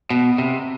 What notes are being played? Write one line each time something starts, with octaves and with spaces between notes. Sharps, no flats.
B2
C3